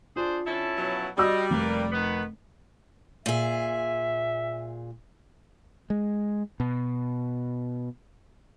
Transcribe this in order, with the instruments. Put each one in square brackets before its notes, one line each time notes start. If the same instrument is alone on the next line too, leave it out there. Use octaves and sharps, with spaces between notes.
[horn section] D4 G#4 C5 [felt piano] F4
[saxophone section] D3 A4 [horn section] C#4 E4 A5
[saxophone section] B2 F3 F#3
[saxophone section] G3 [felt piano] F#4 E6 [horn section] D#5
[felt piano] F1 [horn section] A#3 A#4 B4
[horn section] D#3 B3
[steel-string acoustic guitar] A#2 G#4 [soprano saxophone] E5
[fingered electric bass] G#3
B2